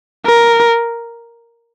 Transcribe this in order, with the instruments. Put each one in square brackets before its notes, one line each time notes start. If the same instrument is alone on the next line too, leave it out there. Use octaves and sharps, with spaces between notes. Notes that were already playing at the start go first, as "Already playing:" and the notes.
[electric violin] A#4